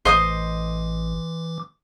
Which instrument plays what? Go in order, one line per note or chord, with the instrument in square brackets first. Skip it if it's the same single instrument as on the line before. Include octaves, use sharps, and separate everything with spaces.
[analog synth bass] A1 [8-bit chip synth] E3 D6 [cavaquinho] C5 D#5 D#6